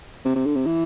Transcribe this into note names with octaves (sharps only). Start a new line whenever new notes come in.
C3
C3
D3
C3
E3